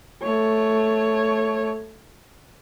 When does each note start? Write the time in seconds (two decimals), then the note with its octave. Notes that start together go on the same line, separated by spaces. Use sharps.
0.23 A3 C#5